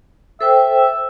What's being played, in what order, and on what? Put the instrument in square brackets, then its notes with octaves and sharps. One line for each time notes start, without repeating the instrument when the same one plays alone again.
[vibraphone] A4 C5 G5 [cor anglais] E5